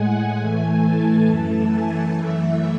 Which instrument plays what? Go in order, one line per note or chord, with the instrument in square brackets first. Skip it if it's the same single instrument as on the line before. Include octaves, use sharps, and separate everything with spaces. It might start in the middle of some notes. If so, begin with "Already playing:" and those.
Already playing: [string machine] A2 G#3 F#5 G#5
A2 E3 A3 G#5
A5
F#2 E3 A3 A5
G#5
F#2 E3 A3 E5